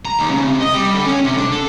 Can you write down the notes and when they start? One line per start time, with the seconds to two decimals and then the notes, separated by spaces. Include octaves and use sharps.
0.05 A#5
0.19 D#2
0.30 C#3
0.45 C3
0.61 D#5
0.74 G3
0.93 D3
1.05 C#4
1.24 C3
1.38 D4
1.52 A4